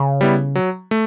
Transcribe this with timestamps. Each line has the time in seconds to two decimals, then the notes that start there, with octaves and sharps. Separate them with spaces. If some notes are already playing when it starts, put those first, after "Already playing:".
Already playing: C#3
0.21 G3 B3 E4
0.55 F#3
0.91 A3